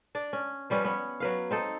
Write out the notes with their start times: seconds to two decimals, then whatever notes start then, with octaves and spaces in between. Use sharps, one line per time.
0.15 D4 D5
0.33 C#4
0.70 F3 G3 C#4 B4
0.84 B3 C#4
1.20 F#3 B4 F5
1.51 C4 D#4 A4